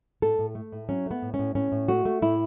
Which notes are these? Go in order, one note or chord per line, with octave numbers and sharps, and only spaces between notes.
A2 A4
A2
A3
A2
F#3 C#4
A3 B3
A2
C#4
A2
A2 C#4
A2
A3 F#4
A3
A2 E4